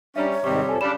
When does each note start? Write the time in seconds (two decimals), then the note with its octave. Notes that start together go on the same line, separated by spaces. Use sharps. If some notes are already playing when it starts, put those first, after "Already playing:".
0.16 G3 C#4 D4 E5 A#5
0.31 C#5
0.44 G#2 C3 D#3 G3 C4 C#6
0.69 F2 F3 A4 G#5
0.81 C#3 G3 D4 D5 B5 E7